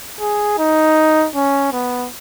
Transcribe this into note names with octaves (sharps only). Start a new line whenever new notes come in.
G#4
D#4
C#4
B3